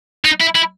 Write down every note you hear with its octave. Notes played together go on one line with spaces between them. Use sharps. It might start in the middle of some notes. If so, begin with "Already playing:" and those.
D#4
E4
E4